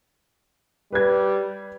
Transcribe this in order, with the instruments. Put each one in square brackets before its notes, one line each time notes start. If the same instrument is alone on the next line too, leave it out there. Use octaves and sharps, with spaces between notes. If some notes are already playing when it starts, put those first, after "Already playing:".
[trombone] G3 [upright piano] B4 G#6